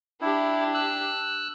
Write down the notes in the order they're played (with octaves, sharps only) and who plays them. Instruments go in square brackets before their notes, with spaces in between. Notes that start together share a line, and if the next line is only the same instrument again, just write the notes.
[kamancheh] D4 G4 [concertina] E4
[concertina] E6 F#6